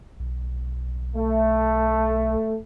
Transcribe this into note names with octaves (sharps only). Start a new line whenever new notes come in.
B1
A3